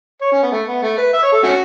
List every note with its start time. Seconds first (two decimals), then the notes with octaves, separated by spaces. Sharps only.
0.21 C#5
0.32 C#4
0.43 B3
0.52 A3
0.68 B3
0.83 A3
0.98 B4
1.13 E5
1.23 C#5
1.33 A4
1.43 A3 C#4 F#4